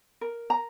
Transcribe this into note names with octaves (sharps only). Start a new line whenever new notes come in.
A#4
A#5